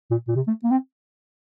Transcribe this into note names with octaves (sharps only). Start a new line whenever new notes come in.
A#2
A#2
C3
A3
A#3
C4